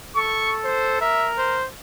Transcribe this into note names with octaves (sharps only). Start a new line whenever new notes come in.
A4 C#6
C5
A#4 E5
C5